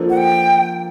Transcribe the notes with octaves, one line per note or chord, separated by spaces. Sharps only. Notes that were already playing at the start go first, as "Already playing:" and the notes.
Already playing: F3 A#3 D4 F4 A4
F#5
G5